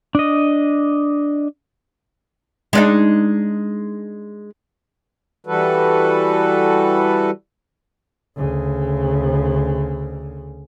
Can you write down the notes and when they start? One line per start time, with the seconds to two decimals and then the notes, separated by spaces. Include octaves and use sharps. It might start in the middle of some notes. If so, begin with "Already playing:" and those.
0.15 D4 D#5
2.73 G#3 D4 D#4
5.47 E3 G3 F#4 A4 B4
8.37 D2 C#3